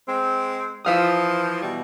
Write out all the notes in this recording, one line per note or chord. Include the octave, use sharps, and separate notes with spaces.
G#3 C4
E3 F3 E5 F5 D#6
B2 E3 G3